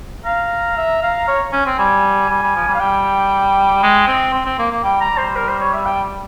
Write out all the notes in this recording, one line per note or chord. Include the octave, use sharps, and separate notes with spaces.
F5 A#5
E5
F5
C#5
C#4
C4
G3 G#5
G3
G3
F3
G3
F5
G3 G5
G#3
C4
C4
C4
A#3
A#3
G3 G5
A#5
G3
C5
A#4
C5
C#5
E5
G5